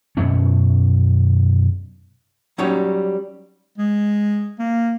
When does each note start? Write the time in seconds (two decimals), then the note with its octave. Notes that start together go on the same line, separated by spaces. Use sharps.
0.17 F#2 B2 A3 C#4
2.58 F#3 G3 C#4 D#4 C#5
3.78 G#3
4.59 A#3